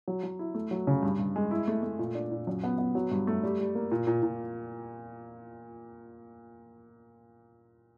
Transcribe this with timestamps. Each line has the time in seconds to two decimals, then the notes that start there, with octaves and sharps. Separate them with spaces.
0.08 F#3
0.23 F#3
0.39 E4
0.55 A3
0.71 F#3
0.87 C#3
1.03 G2
1.19 G2
1.36 G#3
1.51 E4
1.68 A3
1.83 A3
1.99 A#2
2.15 D4
2.31 A#2
2.47 F#2
2.64 B3
2.78 B3
2.95 F#3
3.11 G2
3.27 A3
3.43 G3
3.59 G3
3.75 A#3
3.91 A#2
4.07 A#2
4.23 A#2